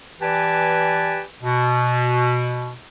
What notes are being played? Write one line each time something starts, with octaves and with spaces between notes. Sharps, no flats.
E3 G4 B4 D5 G#5 A5
B2